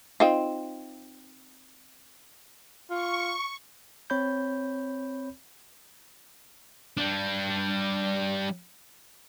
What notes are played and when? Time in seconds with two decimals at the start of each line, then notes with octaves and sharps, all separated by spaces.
0.20 C4 D#4 F4
2.90 F4 C#6
4.10 C4 C#5 B5 G6
6.97 G3 D4